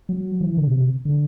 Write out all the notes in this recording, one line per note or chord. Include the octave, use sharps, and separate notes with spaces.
F#3
E3
D3
B2
C3
D3